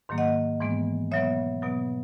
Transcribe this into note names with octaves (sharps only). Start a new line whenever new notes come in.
G#2 D#3 F#3 A#3
D#5 F#5
G#2 E3 G#3 B3
B2 F#3 B3 C#5 E5
B2 F#3 B3